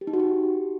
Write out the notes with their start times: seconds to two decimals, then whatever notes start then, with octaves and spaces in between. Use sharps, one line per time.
0.01 G4
0.07 D#4
0.13 F#4
0.20 G4